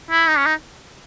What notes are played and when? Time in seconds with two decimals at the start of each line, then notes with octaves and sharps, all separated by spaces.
0.11 E4
0.28 D#4
0.38 C#4
0.46 D#4